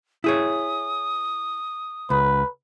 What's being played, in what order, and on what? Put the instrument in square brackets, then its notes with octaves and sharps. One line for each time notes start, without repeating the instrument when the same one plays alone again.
[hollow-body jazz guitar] E4 G#4 C#5 [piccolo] D#6
[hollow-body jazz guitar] C#2 [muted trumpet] B4